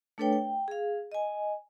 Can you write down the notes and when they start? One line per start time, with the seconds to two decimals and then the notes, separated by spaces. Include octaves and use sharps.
0.18 A3 D4 A4 B4 C#5 G5
0.33 G5
0.68 G#4 F5
1.12 D#5 G#5